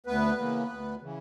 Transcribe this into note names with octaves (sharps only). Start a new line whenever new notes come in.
D2 B3 B4
C#3 E3 A#3
D2
C#3 E3